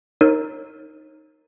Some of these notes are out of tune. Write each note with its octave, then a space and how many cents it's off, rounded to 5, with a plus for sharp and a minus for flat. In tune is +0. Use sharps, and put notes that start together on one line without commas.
D#4 +0 A#4 +0 C#5 -40